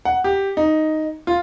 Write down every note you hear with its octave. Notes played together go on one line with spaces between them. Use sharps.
F#5
G4
D#4
F4